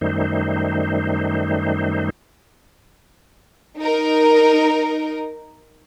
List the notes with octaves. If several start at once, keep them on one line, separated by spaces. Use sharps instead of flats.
F#2 D#3 G3 A3 D#4 C5
D#4 A#4